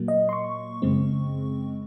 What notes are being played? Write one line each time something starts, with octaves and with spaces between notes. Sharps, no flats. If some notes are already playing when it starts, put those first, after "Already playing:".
Already playing: A#2 F#3 A#3
D#5
C6
C#6
F#2 C#3 G#3 C4